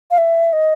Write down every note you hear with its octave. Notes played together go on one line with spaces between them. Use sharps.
F5
E5
D#5